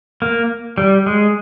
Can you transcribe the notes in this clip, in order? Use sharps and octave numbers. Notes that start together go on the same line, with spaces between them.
A#3
G3
G#3